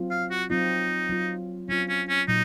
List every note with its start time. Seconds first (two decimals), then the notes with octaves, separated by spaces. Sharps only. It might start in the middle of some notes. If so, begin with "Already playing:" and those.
Already playing: F#3 C4 F4
0.11 F5
0.30 F#4
0.50 F#3 C4 D#4 F4
1.09 F#3 C4 F4
1.69 F#3 C4 C#4 F4
1.89 C#4
2.08 C#4
2.28 A#2 F#3 D#4